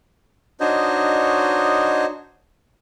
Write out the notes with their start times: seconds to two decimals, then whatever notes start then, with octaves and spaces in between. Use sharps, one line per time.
0.60 D4 D#4 F#4 C5 C#5 D#5